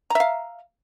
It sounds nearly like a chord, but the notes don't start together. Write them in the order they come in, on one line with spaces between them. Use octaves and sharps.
A#5 E5 F5